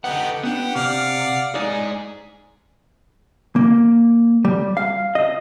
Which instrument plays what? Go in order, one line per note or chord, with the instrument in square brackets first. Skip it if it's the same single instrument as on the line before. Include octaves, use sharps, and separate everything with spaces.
[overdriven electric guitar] D3 B3 [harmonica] D#4 G4 [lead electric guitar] F#5
[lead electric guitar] B3 D4 [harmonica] G4 [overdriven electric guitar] F#5
[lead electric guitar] C3 [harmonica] D5 F5
[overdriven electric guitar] G#2 G#4 [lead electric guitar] D#4 D5
[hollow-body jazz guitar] A#3
G3
F5
D#5